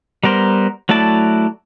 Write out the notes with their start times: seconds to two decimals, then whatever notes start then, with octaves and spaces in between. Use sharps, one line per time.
0.24 G3 B3 A#4 C5
0.89 F#3 A3 E4 D5 A5